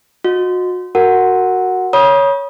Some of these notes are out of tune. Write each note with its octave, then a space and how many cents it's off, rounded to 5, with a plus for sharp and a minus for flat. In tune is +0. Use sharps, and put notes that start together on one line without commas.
F#4 -30 D#5 +0
F#4 +0 A#4 -15 F#5 +0
C#5 +5 B5 -40 D#6 +0